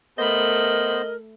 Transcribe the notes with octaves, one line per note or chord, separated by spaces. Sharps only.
A3 B3 A#4 C5 D#5 B5